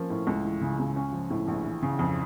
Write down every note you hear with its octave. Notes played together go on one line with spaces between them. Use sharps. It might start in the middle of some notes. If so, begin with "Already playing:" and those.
Already playing: F3 A#3 C#4
A2
C#2
E3
C#3
C#2
C#4
F3
A2
A#1
E3
C#3
F2